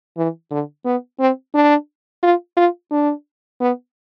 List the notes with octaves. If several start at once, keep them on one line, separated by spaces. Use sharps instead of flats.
E3
D3
B3
C4
D4
F4
F4
D4
B3